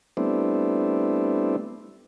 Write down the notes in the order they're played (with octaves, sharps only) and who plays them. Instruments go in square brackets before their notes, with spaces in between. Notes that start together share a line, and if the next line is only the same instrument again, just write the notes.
[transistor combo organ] G3 A3 B3 C4 D4 E4